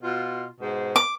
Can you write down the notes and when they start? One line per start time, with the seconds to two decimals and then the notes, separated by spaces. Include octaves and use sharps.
0.02 B2 F4
0.59 G#2 B2 C5
0.96 D6